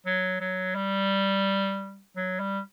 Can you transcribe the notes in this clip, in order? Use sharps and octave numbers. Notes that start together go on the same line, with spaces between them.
F#3
F#3
G3
F#3
G3